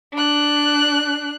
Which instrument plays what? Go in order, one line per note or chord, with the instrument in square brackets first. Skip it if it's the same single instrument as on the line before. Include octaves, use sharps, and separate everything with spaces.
[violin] D4 F#6